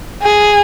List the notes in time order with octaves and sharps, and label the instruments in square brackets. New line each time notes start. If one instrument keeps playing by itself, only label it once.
[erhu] G#4